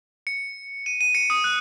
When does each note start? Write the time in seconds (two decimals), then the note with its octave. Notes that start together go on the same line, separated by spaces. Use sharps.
0.27 C#7
0.86 D#7
1.01 D#7
1.15 C#7
1.30 D#6
1.44 F#6